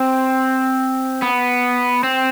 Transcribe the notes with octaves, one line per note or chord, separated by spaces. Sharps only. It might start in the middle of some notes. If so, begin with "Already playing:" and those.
Already playing: C4
B3
C4